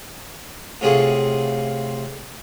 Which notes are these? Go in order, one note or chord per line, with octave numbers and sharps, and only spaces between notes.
A2 C3 F4 G#4 F#5 C#6